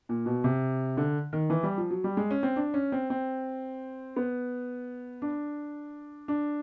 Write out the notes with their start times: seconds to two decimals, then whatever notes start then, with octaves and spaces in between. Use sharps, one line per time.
0.09 A#2
0.26 B2
0.44 C3
0.97 D3
1.33 D#3
1.50 E3
1.63 G3
1.78 F3
1.91 F#3
2.04 G3
2.17 G#3
2.31 C#4
2.43 C4
2.56 D4
2.74 C#4
2.92 C4
3.10 C4
4.16 B3
5.22 D4
6.28 D4